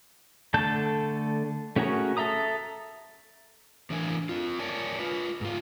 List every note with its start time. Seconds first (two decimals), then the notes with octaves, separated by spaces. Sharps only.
0.54 D3 A3 A4 A5 G6
1.76 A3 C#4 F#4 G#4 A#4
2.17 A4 E5 A#5 D#6
3.90 A2 E3 D4 A#4 D#5 G#5
4.29 C4 F4
4.59 A#4 C#5 D5 G#5 A5
4.99 F4 B4
5.41 G#2 F4